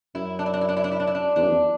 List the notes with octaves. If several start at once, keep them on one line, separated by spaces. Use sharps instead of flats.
F#2 E4
D4
E4
D4
E4
D4
E4
D4
E4
D4
E4
D4
E2 D4
F#2
E2